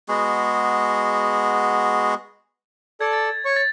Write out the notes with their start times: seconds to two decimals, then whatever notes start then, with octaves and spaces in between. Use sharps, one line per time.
0.08 G#3 B3 F#4 G#4
3.01 A4 D5 A5 G#6
3.13 A6
3.45 C#5 C#6
3.56 A6